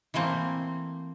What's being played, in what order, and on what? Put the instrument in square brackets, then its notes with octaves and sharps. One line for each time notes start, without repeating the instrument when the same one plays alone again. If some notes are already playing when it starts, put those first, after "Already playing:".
[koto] E3 A3 A#3 C4